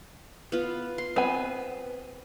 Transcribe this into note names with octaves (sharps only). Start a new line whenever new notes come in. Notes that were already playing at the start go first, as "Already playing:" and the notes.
B3 F4
C6
B3 C4 G#5